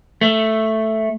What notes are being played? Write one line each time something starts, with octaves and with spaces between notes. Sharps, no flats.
A3